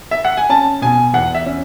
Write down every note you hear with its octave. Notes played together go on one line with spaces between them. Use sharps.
E5
F#5
G#5
C#4 A5
B2 G#5
E2 F#5
E5
C#4